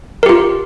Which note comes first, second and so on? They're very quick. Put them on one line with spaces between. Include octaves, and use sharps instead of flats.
A#4 G4 F4